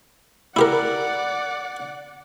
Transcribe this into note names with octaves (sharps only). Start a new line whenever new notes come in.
E4 G4 A#4 D5 F#5